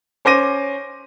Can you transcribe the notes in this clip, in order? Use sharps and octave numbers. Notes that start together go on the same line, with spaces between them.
C#4 C5 D6 A#6 D#7